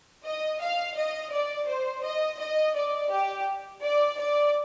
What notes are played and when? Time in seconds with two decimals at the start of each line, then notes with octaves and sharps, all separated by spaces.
0.24 D#5
0.61 F5
0.96 D#5
1.31 D5
1.68 C5
2.03 D#5
2.39 D#5
2.75 D5
3.10 G4
3.82 D5
4.18 D5